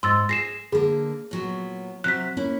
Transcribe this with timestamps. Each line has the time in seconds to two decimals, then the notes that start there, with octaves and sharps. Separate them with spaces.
0.03 G#2 C6 E6 A6
0.29 G#4 A#6 C7 E7
0.72 D3 A#3 G#4
1.31 A#2 F#3 B3
2.04 C3 F#3 E5 F#6 B6
2.37 A#3 C#4 E4